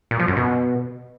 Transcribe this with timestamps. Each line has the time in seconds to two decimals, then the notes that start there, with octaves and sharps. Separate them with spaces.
0.11 A#2
0.20 F3
0.28 F#2
0.37 B2